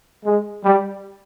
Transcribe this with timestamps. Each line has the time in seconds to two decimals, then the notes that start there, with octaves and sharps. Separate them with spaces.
0.25 G#3
0.64 G3